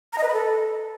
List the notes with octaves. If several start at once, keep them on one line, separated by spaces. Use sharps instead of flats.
A#5
D#5
B4
B5
A4